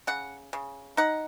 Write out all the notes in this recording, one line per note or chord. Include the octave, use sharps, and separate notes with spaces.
C#3 F#5
C#3
D#4 F#5